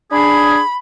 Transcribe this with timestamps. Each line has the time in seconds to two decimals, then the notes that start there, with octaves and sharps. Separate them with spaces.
0.12 D4 G#4 B5